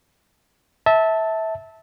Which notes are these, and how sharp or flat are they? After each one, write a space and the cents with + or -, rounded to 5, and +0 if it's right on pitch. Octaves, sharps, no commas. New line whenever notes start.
E5 -20 A5 +0